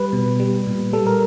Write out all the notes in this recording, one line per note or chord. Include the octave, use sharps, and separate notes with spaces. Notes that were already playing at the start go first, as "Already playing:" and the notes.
Already playing: G3 B4
B2
G3
A#2
G3 A4
A#4